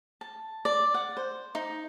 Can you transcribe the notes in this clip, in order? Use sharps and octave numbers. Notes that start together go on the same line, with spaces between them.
A5
D5
F#5
C5
D#4